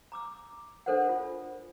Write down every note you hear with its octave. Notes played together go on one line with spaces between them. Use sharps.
A#5 D6 E6
D4 A4 A#4 C5 D5 F#5
F4